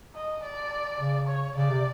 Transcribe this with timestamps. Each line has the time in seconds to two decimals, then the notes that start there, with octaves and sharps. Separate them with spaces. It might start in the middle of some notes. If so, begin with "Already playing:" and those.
0.15 D#5
0.43 D5
1.00 C#3
1.27 C#5
1.56 C#3 D5
1.69 C3